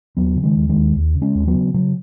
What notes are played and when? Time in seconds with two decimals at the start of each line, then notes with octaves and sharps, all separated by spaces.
0.17 D#2 F#3 B3
0.36 C#3
0.43 D#3 G#3
0.56 D#2
0.69 D#3 G#3
0.76 D#2
0.95 D#2
1.15 C#3
1.21 G#3 C#4
1.35 D#2
1.47 F#3 B3
1.54 C#3
1.74 C#3 F#3